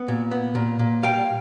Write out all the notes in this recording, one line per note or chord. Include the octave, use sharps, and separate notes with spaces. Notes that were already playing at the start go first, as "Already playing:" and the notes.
Already playing: B3
A#2
B3
A#2
A#2
G3 F5 G5